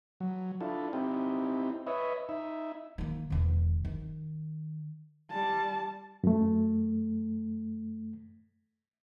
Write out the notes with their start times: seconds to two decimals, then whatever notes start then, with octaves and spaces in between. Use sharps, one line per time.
0.20 F#3
0.61 D4 E4 F4 A4
0.93 C4 D#4 E4 G4
1.87 B4 C#5 D#5 E5
2.29 D#4 E5
2.98 D#3 A#3
3.30 E1 D#3
3.85 D#3
5.30 G3 A5
6.24 F#2 A3